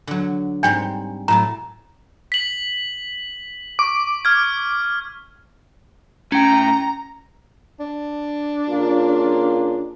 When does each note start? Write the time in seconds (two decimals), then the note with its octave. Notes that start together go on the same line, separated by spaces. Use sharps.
0.07 D3 F#3
0.63 G#2 G3 C4 D4 G5
1.28 A2 F#3 A5 A#5
2.32 B6 F#7
3.79 C#6 D6
4.25 F6 G#6
6.32 A2 C#4 G5 A#5
7.80 D4
8.69 C#3 A#3 F4